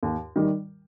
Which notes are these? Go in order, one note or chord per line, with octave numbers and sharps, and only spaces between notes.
D#2
D#3 G3